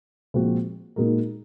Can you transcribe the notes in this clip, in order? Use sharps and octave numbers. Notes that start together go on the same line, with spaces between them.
A#2 F3 G#3 C4 F#4
A#2 G#3 D#4 F#4 A#4